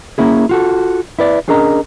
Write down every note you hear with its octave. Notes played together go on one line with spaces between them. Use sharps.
A#3 C#4 E4 G#4
F4 F#4 A4
E4 B4 D5
C#4 D4 G#4 A#4 D#5 A#5